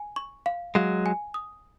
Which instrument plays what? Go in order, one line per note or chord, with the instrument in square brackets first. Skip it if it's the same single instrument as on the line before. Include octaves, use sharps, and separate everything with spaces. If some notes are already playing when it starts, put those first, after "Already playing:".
Already playing: [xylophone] G#5
C#6
F5
[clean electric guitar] F#3 G#3 [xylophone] F5
[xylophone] G#5
D#6